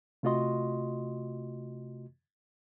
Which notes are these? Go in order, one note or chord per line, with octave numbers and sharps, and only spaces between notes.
C3 A3 F4 F#4 D#5 C6